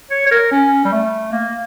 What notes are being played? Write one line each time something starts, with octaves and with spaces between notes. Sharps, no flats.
C#5
C#5
A#4
C#4
G3
A3
A#3